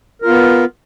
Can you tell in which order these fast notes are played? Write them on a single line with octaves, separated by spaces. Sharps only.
A#4 F4 B3